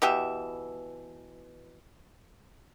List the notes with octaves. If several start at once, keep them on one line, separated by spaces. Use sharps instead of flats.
B2 E3 G4 E5